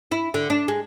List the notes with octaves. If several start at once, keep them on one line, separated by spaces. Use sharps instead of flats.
E4
D3
D4
G#3